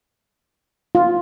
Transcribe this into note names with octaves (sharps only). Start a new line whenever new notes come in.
F4